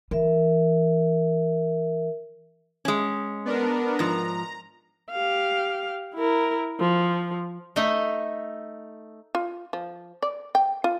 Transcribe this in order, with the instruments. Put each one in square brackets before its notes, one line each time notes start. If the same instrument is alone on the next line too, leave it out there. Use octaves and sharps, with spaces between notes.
[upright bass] E3 [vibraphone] A#4 E5
[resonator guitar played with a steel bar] G#3 C#4
[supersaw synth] B3 D4 A#4
[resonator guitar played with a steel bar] G#2 F3 [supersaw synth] A#5
[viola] G4 F5
E4 A#4
F3
[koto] A3 D#4 D#5 E5
[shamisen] F4
F3
D5
G5
F4